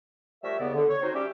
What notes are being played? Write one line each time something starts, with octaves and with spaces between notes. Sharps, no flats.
F3 G3 A3 A#4 C#5 E5
D#2 C#3 B3 D5
D3
C#5
C4 D#4 F#4 C5
G3 C#4 G4 E5